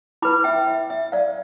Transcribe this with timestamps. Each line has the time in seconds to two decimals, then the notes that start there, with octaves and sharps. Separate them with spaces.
0.22 E4 B4 B5 D6
0.44 E5 G5
0.67 E5
0.90 E5
1.12 D5 F5